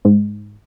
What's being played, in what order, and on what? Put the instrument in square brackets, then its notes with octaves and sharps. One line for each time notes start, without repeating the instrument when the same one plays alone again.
[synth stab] G#2